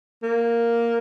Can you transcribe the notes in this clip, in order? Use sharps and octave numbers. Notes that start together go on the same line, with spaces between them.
A#3